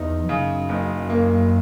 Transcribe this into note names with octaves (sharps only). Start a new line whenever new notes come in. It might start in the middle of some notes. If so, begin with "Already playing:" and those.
Already playing: E2 D#4
F#2 C#3
F#1
A#3